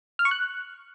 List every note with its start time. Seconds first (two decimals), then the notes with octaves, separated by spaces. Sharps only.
0.19 F6
0.25 C#6
0.31 F#6